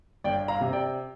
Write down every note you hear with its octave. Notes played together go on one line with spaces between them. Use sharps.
G1 D5 G5
F5 A#5
C3
D5 G5